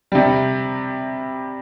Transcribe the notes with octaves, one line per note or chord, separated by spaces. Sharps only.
C3 G3